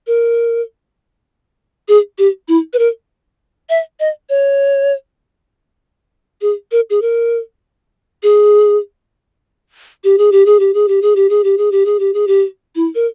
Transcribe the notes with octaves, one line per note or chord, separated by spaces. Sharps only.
A#4
G#4
G4
E4
B4
A#4
E5
D#5
C#5
G#4
A#4
G#4
A#4
G#4
G4
G#4
G4
G#4
G4
G#4
G4
G#4
G4
G#4
G4
G#4
G4
G#4
G4
G#4
G4
E4
A#4